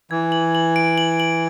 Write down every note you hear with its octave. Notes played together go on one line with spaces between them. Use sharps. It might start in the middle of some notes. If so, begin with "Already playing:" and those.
E3 G#6
F#7
F#7
D7
F#7
F#7